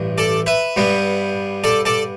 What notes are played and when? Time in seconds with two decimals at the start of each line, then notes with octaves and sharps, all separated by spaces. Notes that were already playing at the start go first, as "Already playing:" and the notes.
Already playing: A1 G2
0.18 A4 D5
0.46 B4 E5
0.76 G2 G3 B3
1.64 A4 D5
1.85 A4 D5